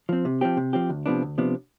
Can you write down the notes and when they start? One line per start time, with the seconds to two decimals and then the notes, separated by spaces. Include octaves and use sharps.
0.09 F3 C4
0.25 C3
0.41 F3 C4 G4
0.57 C3
0.73 F3 C4 G4
0.90 D2
1.06 C3 F3 B3 D4
1.22 D2
1.38 C3 F3 B3 D4